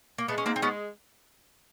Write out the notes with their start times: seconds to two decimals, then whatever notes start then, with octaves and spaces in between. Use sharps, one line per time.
0.18 A#3
0.28 G#3 A3 B3
0.38 C#4
0.46 G#2 A#3 C4
0.56 C4
0.62 G#3 B3 C#4